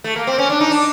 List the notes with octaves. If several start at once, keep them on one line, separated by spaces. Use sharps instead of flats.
A3
A#3
C4
C#4
D4
D#4
D4